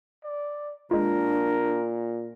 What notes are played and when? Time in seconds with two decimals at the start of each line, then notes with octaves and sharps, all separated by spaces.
0.24 D5
0.91 A#2 G#3 D4 F4 A#4